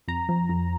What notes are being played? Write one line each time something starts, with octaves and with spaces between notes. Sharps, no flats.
F2 A#5
F3
F2